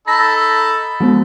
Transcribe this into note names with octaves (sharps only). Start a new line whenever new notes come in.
D#4 A4 B5 A#6
F3 G#3 B3